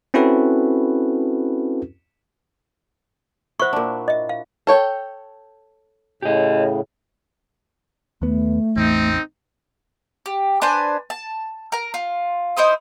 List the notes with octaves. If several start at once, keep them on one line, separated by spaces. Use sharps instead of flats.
C4 C#4 E4 F#4 A4 B4
E4 F#4 C5 C#6
A#2 D4
D#5 E5
F5
A4 C#5 G5
A2 C#3 G4 D#5
D#2 A3 B3
A1 E2 C4 D#4
G4
D4 B4 C5 G#5
A5
A#4 A#5
F4
D#4 E4 C5 D#6